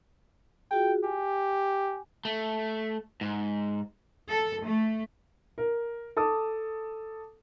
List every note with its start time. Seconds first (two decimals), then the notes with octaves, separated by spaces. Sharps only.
0.71 F4 F#4 G#4 G5
1.04 G4 G#5
2.25 A3
3.21 G#2
4.29 A4
4.64 A3
5.58 A#4
6.17 A4 A5 D6 D#6